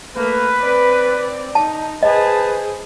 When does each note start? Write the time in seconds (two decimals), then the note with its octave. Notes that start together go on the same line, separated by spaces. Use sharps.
0.15 A3 A#3 B4
0.59 C4 D5
1.55 D#4 A5
2.03 G#4 B4 C5 D#5 A5